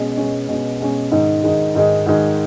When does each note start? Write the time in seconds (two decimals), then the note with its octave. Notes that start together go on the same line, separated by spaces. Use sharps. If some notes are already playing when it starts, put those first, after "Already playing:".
Already playing: B2 G#3 C#4
0.17 B2 G#3 C#4
0.49 B2 G#3 C#4
0.80 B2 G#3 C#4
1.11 G#2 D#3 G#3
1.43 G#2 D#3 G#3
1.75 G#2 D#3 G#3
2.06 G#2 D#3 G#3